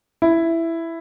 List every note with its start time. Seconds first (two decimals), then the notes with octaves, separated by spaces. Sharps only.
0.22 E4